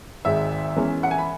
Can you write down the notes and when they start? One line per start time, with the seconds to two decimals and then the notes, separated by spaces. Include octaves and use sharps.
0.25 G#1 G#2 G#3 E5
0.76 E2 E3 G#3 C#4
1.03 F#5
1.11 G#5
1.18 B5